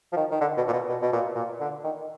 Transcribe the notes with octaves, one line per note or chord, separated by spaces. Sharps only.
F3
D#3
D#3
D3
B2
A#2
B2
B2
B2
A#2
A#2
D3
D#3